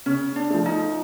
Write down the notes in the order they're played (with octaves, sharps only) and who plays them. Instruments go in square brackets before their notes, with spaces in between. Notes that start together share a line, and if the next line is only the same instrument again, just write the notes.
[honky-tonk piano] C#3 [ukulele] C#4
[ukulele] D4
[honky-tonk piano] F3 A3
[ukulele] D#4